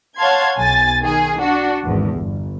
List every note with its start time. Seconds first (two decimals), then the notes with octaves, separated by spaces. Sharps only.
0.17 C#5 F5 F#5 A5 C6 G#6
0.56 B1 G#5 A6
1.04 D#3 G#4
1.41 D4 F#4
1.84 G#1 E2
2.15 G1